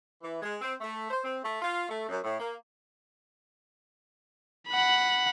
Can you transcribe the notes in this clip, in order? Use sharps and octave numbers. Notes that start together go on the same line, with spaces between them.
E3
G#3
C4
A3
C5
C4
A3
F4
A3
F#2
A2
A#3
F#5 B5